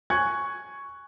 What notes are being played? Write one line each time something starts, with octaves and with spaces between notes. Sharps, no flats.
G#5 C#6 F#6 G#6